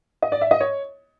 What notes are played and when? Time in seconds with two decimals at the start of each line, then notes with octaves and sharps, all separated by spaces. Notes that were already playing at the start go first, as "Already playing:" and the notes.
0.22 D#5
0.32 D5
0.41 E5
0.51 D#5
0.61 C#5